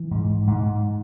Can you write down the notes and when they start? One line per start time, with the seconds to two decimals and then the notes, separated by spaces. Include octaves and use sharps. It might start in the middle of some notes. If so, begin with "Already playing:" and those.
Already playing: E3
0.11 G#2
0.47 G#2